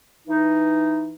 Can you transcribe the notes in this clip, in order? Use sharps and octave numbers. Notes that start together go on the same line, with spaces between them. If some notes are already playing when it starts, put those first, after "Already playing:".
E3 D#4